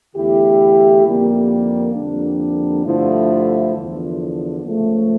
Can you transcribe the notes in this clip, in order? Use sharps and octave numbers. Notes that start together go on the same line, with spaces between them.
E2 D3 A3 E4 G4
F2 D3 G3 A#3
F2 D3 G3 A#3 D4
G2 D3 F3 A3 E4
E2 D3 F3
C#2 C#3 F3 A3